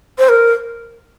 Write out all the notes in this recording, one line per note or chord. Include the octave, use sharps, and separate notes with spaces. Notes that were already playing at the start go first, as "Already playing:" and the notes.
C5
A#4